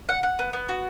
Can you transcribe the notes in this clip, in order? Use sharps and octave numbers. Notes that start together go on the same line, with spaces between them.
F#5
F#5
B3
B3
F#4